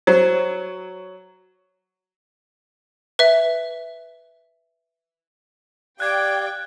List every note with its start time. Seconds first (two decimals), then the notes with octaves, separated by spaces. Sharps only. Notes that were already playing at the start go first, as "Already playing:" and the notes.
0.07 F#3 C5
3.19 B4 E5
6.00 G4 D5 F5 G5 F#6 G#6